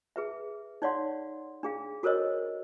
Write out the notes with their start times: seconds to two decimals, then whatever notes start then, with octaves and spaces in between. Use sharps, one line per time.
0.16 G#4 B4 E5
0.82 D#4 C#5 D5 F5 F#5 C6
1.63 D4 G#4 F5
2.03 F#4 A4 A#4 C5 C#5 D#5